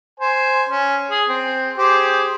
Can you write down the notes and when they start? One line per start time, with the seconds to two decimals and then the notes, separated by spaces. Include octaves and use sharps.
0.20 C5 G#5
0.69 C#4
1.10 G#4
1.29 C4
1.78 G4 G#4 C5